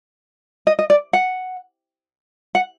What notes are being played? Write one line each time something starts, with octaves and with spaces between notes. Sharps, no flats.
D#5
D#5
D5
F#5
F#5